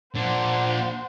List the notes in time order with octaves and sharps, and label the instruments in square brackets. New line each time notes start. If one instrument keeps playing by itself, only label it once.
[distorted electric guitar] A#2 D4 [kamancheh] C5 F#5